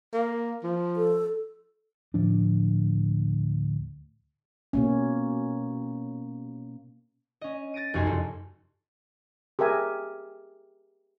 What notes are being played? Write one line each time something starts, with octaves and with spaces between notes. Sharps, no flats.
A#3
F3
A4
D2 A2 F3 D4
B2 A#3 C#4
C#4 D#5
A6 A#6 D7 D#7
F1 B1 F#2 D#4 G#5 C6
F#1 F3 A4
G4 G#4 A#4 E5 G#5